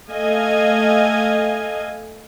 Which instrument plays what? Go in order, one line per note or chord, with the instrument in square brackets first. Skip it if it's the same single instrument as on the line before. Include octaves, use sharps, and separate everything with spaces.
[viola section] A3 A4 D#5 F5 G#5